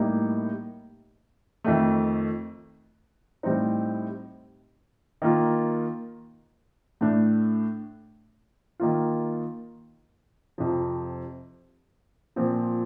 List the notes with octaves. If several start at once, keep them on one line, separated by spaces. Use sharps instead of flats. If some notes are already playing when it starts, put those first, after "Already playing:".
Already playing: A2 G3 A#3 D#4
F2 D#3 A3
A2 G3 C4 D#4
D#3 A#3 F4
A2 A3 D4
D#3 A#3 F4
F2 C3 F3
A#2 F3 C4